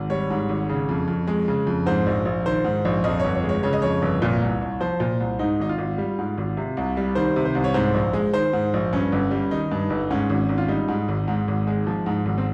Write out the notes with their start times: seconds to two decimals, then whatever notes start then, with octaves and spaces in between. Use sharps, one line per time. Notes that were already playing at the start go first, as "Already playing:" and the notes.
Already playing: G#1
0.10 G3 C#5
0.30 G#2
0.49 G#1
0.69 C#3
0.89 F2
1.08 F2
1.27 G#3
1.48 C#3
1.67 F2
1.86 G#2 C5
2.06 A#1
2.25 A#1
2.46 D#3 C5
2.64 G#2
2.85 A#1
3.04 F2 D#5
3.20 G1 C#5
3.34 C#5
3.44 G#3
3.49 C#5
3.63 C#3 C#5
3.73 D#5
3.82 F2 C#5
4.02 G1
4.22 A#2
4.42 C2
4.61 C2
4.80 F3 C5
5.00 A#2
5.20 C2
5.39 G#2 D#4
5.60 G#1 D#4
5.69 F4
5.78 G#1
5.98 G3
6.19 G#2
6.38 G#1
6.57 C3
6.77 C2
6.97 G3
7.15 D#3 C5
7.36 C3
7.45 C5
7.55 C2
7.64 C#5
7.74 G#2 C5
7.94 A#1
8.13 G#3
8.34 D#3 C5
8.53 G#2
8.73 A#1
8.93 G2 C#4
9.12 G1
9.31 G3
9.51 D#3 D#4
9.72 G2
9.90 G1
10.10 G#2 C#4
10.30 G#1
10.49 G#1
10.58 F4
10.68 G3 D#4
10.88 G#2
11.08 G#1
11.28 G#2
11.48 G#1
11.67 G#3
11.87 F3
12.06 G#2
12.25 G#1
12.38 C4